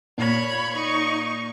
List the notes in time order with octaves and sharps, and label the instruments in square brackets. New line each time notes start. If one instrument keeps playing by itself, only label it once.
[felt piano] A#2 [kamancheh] C#5 B5
[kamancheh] D#4 C#6